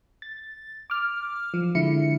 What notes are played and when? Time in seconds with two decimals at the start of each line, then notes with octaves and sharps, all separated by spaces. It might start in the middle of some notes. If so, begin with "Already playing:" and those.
0.22 A6
0.90 D6 F6
1.54 F3
1.75 D3 G#3 E4 C#7